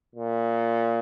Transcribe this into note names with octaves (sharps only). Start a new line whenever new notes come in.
A#2